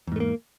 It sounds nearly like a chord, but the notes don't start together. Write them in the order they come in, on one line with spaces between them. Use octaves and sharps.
E2 G#2 A3 A#3